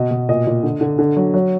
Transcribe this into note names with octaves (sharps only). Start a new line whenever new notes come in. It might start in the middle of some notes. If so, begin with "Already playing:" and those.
Already playing: B2 D#5
B2
A#2 D#5
A#2
D3
D3
D3
F#3
F#3